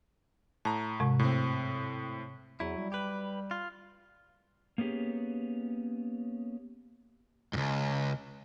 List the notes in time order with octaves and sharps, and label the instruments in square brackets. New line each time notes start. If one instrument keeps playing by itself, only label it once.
[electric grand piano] A2 A#5 [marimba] A5
[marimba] G#2 C3 G#3
[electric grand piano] A2 C4
[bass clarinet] E2 [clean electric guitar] F#3 E4
[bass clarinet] G3
[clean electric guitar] G4 B4
F4
[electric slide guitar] A#3 B3 C#4 G4 G#4
[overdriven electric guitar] C#2 G2